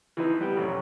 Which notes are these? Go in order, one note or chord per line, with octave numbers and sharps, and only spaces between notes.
E3 F3 C4 D#4 B4
G3 B3 G5
A1 F2 C3 F#3 C#4